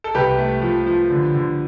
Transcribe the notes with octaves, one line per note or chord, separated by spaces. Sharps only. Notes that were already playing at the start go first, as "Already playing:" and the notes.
A4
C2 G4 B4
A3
F3
F3
D3
D3